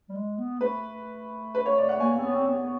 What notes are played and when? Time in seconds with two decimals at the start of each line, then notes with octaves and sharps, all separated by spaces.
0.09 G3
0.15 G#3
0.38 B3
0.61 A3 B4
1.55 B4
1.66 C#5
1.78 D5
1.89 F#5
2.00 A#3 G#5
2.17 C4
2.24 B3
2.35 C4
2.48 B3